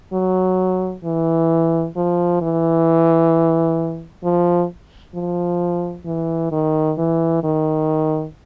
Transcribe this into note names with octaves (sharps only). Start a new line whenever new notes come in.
F#3
E3
F3
E3
F3
F3
E3
D#3
E3
D#3